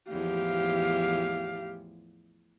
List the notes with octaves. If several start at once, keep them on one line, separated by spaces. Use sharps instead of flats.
E2 A2 F3 G4 F5